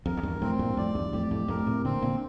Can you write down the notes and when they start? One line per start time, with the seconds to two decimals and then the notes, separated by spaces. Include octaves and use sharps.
0.06 F2 A#4
0.17 F2
0.23 E2 G2
0.42 F2 A2 C4
0.59 G2 A#2
0.77 F2 A2 D5
0.95 E2 G2
1.13 F2 A2 G4
1.31 F2 A2
1.48 F2 A2 A#4
1.67 A2 C3
1.85 A#2 D3 C4
2.02 A#2 D3